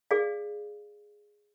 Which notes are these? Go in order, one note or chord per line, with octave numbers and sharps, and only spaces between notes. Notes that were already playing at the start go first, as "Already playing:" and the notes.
G#4 D5 F5